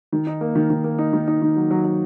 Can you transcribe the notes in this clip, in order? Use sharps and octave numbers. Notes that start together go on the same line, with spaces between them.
D#3
D#4
A#3
D#3
D#3
A#3
D#4
D#3
D#4
D#3
F#3
F#3
F#3